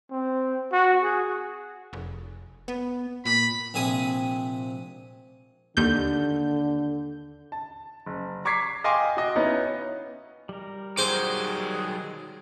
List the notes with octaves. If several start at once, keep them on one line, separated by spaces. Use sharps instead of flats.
C4
F#4
G#4
F1
B3
A#2 B5
A#1 C3 G#4 G#5 D#6
D#2 D3 G6
A5
F#1
A#5 C#6 D6 G#6 B6 C7
D#5 F5 G5 G#5 C6 D6
F#4 D#5
B3 C#4 D#4 E4 D#5
G3 A#4
D#3 F#3 G#4 C5 D6